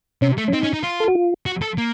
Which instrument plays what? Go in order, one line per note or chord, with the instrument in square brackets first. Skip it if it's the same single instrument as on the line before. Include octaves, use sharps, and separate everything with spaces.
[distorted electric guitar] C3 [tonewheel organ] C#4
[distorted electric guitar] A3
[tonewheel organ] C#4
[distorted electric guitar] C4 [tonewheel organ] D#4
[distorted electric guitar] C#4
D#4
F4
[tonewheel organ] A4
F#4
F4
[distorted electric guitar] F#4
A4
A#3